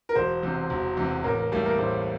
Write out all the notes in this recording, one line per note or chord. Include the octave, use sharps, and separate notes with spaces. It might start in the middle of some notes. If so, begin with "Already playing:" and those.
A#4
E1 C5
E2 C3
E1
E2 C3
A1 A#4
A#4
A2 G3 A#3
A#4
A1 C5